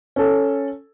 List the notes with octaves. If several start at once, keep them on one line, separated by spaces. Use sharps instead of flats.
C#4 A4